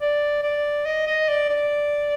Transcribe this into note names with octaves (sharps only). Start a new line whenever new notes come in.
D5
D5
D#5
D#5
D5
D5